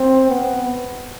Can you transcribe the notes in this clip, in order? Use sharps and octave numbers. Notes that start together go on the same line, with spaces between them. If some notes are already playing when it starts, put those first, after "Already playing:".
Already playing: C4
B3